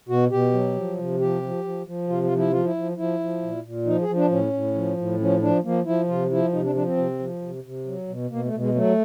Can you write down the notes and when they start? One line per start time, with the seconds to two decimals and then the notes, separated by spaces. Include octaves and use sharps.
0.09 B2 F#4
0.31 B2 G4
0.53 F#3
0.76 F3
0.98 C3
1.20 F3 G4
1.42 F3
1.64 F3
1.86 F3
2.09 C3 F4
2.23 F4
2.31 F3
2.38 E4
2.51 F3 F4
2.65 E4
2.76 F3
2.97 F3 E4
3.20 F3
3.42 A#2
3.64 A#2
3.86 F3 D#4
4.01 G#4
4.08 F3
4.16 D4
4.31 A2 C#4
4.53 A2
4.75 F3
4.97 A2
5.19 F3 C#4
5.42 F3 D4
5.64 F3 A#3
5.86 F3 E4
6.08 C3 F4
6.31 F3 E4
6.53 C3 D#4
6.64 D4
6.75 F3 D4
6.86 C4
6.97 C3
7.19 F3
7.42 C3
7.64 C3
7.86 F#3
8.08 B2
8.30 B2 A#3
8.45 A3
8.53 B2
8.60 G#3
8.75 F#3 A3